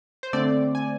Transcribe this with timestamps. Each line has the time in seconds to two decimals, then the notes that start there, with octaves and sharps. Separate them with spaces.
0.23 C5
0.33 D3 A3 C4 D5
0.75 G#5